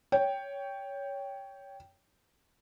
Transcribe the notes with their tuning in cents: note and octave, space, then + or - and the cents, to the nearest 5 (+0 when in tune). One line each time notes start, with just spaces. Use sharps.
C#5 +15 G5 +0